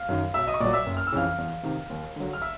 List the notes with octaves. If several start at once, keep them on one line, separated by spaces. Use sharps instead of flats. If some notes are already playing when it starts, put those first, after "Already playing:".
Already playing: F5 F6
F#2 D#3
B1 E5 E6
D#5 D#6
C#6
A#2 F#3 D5 D6
E5 E6
F#1
F6
E6
F2 C#3 E3 F5 F6
E2
C3 D#3
D#2
D3 F#3
F6
E5 E6